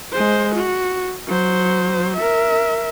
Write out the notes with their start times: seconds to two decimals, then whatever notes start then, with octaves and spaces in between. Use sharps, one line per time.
0.12 G#3 C5
0.55 F#4
1.27 F#3 C5
2.16 A#4 E5